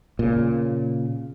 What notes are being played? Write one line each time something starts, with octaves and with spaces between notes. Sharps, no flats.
A#2 C#3